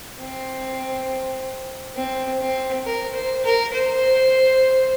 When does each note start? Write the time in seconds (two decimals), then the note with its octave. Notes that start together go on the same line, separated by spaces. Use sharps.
0.19 C4
1.96 C4
2.41 C4
2.86 A#4
3.15 C5
3.45 A#4
3.74 C5